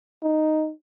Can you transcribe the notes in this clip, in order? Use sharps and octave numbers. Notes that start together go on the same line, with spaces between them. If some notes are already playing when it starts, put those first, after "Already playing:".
D#4